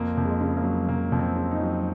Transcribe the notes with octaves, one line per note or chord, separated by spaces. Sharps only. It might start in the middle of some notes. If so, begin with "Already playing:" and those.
Already playing: F2 A#3
F2
G#3
C#3
A#3
F#3
F2 A#3
F2
C4
C#3
D#4
F#3